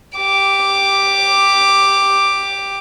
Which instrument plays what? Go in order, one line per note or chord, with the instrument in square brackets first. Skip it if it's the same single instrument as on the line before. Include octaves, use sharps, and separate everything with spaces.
[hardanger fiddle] G4 D6